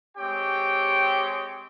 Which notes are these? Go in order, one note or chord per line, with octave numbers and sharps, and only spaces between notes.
G#3 C4 G4 C#5 G5